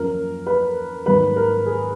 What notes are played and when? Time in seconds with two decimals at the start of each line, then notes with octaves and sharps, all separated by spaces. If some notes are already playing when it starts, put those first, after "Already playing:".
Already playing: F#2 F3 A#3 C#4 A#4
0.47 B4
1.06 G#2 F#3 A#3 B4
1.36 A#4
1.66 G#4